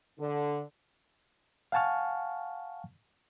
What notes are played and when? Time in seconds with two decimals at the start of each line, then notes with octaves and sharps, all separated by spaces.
0.19 D3
1.72 F5 F#5 G#5 A5 C#6 F6